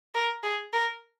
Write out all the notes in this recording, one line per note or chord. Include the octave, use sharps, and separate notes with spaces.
A#4
G#4
A#4